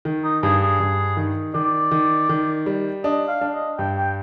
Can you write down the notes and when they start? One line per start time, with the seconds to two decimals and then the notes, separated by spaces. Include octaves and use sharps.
0.05 D#3
0.24 D#4
0.43 G2 G#4
0.62 G#4
0.80 G2
1.17 D#3
1.54 D#3 D5
1.91 D#3
2.29 D#3
2.66 G3
3.04 D4 D#5
3.28 F5
3.41 D4
3.54 D#5
3.78 G2 G5
3.97 G5